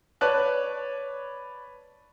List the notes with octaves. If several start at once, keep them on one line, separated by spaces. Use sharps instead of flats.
B4 C#5 D5 A5 F#6